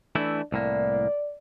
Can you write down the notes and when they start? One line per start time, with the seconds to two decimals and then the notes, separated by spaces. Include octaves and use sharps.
0.15 E3 A3 D4 E4
0.52 C2 A2 A#3 D5